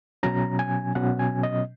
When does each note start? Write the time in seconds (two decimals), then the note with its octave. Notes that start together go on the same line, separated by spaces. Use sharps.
0.23 B2 F#3 C#4 A#5
0.59 G#5
0.95 B2 F#3 C#4 F#5
1.19 G#5
1.43 D#5